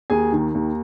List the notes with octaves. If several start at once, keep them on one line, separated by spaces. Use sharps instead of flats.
D#2 G#4 G#5
D#3
D#2